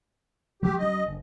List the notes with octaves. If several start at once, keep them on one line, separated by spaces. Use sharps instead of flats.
F3 G#3 G4
D2 F#3 C#4 D#5
F#1 D3